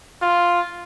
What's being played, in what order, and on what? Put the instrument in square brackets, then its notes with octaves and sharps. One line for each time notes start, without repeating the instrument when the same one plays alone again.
[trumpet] F4